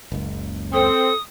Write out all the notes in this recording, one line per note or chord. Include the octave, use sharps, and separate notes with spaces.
F#1 C#2
C4 A4 D#6